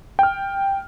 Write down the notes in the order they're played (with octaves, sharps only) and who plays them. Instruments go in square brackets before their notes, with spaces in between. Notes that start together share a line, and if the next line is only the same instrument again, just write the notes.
[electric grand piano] G5 F6